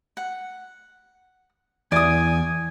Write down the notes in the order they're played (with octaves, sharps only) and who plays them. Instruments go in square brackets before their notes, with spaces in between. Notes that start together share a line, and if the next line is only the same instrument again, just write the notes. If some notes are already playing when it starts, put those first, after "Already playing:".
[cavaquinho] F#5
[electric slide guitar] E2 [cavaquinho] D5 D#6 [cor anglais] G#5